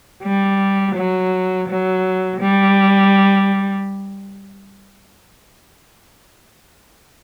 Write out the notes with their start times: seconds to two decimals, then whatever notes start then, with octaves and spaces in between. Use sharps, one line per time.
0.23 G3
0.95 F#3
1.69 F#3
2.41 G3